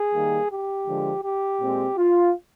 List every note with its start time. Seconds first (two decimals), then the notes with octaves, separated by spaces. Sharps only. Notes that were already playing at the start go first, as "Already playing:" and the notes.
Already playing: G#4
0.13 D#3 G3 A#3
0.49 G4
0.86 D3 F3 G#3
1.24 G4
1.60 A#2 G#3 C4
1.97 F4